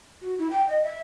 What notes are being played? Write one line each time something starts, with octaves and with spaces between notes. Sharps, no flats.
F#4
E4
G5
D#5
E5